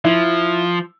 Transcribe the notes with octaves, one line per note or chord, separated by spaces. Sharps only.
F3 E4